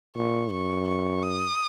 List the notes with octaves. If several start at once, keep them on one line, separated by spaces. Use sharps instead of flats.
A#2 C#6
F#2 C#6
C#6
D#6